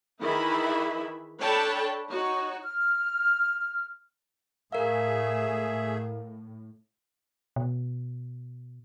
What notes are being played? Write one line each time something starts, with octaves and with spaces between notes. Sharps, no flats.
D#3 E3 E4 G#4 E5 B5
D4 A4 C#5 G5 A5 B5
D#4 F#4 C#5
F6
A2 A3 G#4 A#4 E5 F5
B2